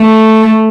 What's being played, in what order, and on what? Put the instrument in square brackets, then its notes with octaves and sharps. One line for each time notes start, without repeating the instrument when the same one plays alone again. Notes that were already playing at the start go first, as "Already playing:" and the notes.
Already playing: [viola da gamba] A3